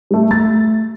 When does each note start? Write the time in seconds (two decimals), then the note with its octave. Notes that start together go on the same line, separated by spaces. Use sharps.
0.11 G3 A3
0.31 A3 A6